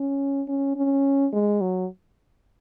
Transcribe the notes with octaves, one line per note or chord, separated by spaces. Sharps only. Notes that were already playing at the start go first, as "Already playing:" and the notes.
Already playing: C#4
C#4
C#4
G#3
F#3